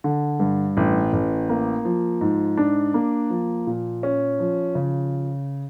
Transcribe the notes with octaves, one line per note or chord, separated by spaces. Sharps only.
D3
G2
A1
A1
A#3
F3
G#2
D4
A#3
F3
A#2
C#4
F3
C#3